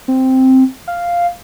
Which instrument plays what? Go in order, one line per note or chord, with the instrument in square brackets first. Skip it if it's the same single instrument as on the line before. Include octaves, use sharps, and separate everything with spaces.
[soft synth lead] C4
F5